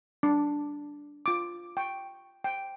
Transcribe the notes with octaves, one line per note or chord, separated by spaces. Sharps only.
D4
F4 D6
G5 C#6
G5